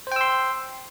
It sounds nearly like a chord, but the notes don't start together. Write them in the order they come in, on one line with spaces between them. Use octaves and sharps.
C5 G5 E6 C6